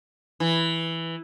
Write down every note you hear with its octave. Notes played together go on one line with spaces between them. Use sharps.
E3